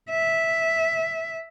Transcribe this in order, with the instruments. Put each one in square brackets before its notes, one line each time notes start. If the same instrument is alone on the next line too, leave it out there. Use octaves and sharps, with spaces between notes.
[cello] E5